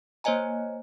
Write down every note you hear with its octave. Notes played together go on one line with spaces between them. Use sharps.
A#3 C5 C#5 D#5 G#5 A#5